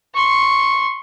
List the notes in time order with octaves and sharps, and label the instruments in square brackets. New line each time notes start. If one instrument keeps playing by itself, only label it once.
[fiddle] C6 C#6